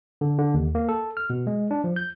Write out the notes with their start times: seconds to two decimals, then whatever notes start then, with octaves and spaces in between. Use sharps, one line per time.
0.21 D3
0.38 D3
0.54 D#2
0.75 A#3
0.89 A4
1.17 F6
1.30 B2
1.47 G#3
1.71 D4
1.84 F3
1.96 G6